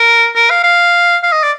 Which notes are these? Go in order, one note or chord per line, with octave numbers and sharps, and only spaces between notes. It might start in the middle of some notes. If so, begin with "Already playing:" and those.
Already playing: A#4
A#4
F5
F5
F5
D#5
D5